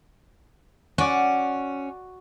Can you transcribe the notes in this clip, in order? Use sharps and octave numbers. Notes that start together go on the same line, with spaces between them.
C#4 F#4 D5